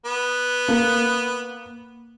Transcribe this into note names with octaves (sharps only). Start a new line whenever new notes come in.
B3
A#3